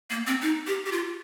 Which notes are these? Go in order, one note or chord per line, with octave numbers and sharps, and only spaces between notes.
A#3
C4
D#4
G4
G4
F4